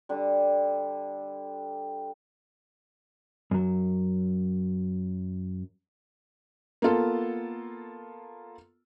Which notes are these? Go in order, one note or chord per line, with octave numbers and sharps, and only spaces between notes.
D3 G3
F#2 F#3
A#3 B3 F4 A4